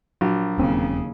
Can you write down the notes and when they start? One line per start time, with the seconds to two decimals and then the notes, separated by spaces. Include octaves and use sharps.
0.21 A#1 F#3
0.58 E1 D#2 C#3 C4 C#4